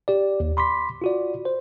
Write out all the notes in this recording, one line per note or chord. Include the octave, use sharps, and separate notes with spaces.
G4 D5
D#2
B5 C6 D6 B6
F4 F#4 D5
C5